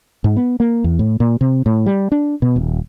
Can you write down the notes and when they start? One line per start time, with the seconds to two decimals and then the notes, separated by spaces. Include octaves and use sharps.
0.24 G#2
0.37 B3
0.60 A#3
0.84 E2
0.99 A2
1.20 A#2
1.41 C3
1.66 A2
1.86 G3
2.12 D4
2.42 B2
2.56 D#1